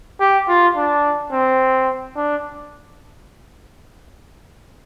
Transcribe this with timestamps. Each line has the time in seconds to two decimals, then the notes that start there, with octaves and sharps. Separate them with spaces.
0.20 G4
0.48 F4
0.76 D4
1.32 C4
2.16 D4